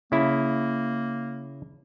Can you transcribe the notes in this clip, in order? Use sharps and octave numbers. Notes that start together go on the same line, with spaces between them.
C#3 A#3 E4